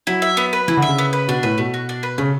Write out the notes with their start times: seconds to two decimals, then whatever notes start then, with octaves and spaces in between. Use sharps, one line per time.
0.07 F#3 E4
0.22 E5
0.37 B3
0.53 B4
0.68 E3 E4
0.77 D3
0.82 E5
0.88 C#3
0.98 B3
1.13 B4
1.28 B2 D4
1.43 A2 B4
1.58 B2 A3
1.74 F#4
1.89 D4
2.03 B4
2.18 C#3 A3